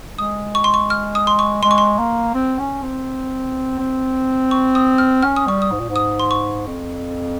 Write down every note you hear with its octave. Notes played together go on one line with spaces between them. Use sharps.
G#3 D#6
C#6
C6
C#6
F6
D#6
C6
C#6
G#3 C6
C#6
C6
A#3
C4
C#4
C4
C4
C#6
D#6
F6
C#4 F6
D#6
G3 C#6
D#6
G#2
A#2
G#2
D#6
C6
C#6
F2